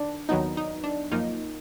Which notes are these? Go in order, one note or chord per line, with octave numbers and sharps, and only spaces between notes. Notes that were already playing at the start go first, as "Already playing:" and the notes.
Already playing: D#3 D4
D#2 D#3 F#3 B3 D#4
D#4
D4
F#2 F3 A#3 D#4